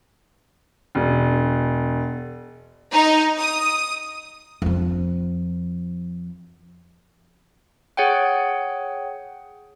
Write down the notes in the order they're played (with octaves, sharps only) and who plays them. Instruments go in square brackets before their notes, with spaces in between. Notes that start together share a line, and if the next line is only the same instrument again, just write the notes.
[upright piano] E1
[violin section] D#4
D#6
[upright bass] F2 F3
[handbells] G#4 C#5 F#5 G5